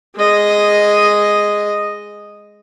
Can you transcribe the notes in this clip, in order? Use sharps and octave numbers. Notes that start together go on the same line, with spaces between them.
G#3 D#5